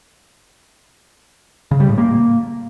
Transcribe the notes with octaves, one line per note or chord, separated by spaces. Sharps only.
C#3
G3
A2
A#3